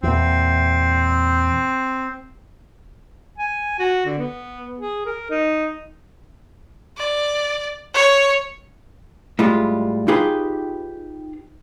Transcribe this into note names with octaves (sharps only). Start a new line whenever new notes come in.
E2 A#2 C4
G#5
F#4
D3
B3
G#4
A#4
D#4
D5
C#5
A2 G3 G#3 F4
D#4 F4 G4 G#4 B4